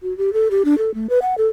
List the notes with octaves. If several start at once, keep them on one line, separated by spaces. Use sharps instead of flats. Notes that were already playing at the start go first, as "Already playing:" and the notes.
F#4
G4
A4
G4
D4
A4
A3
B4
F#5
A4